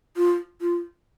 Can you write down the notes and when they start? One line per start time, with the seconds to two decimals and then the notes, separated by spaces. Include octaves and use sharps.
0.17 F4
0.61 F4